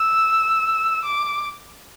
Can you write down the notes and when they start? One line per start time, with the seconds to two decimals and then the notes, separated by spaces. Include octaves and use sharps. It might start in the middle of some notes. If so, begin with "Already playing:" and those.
Already playing: E6
1.05 D6